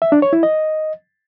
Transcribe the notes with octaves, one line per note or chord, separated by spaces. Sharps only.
E5
D4
C#5
E4
D#5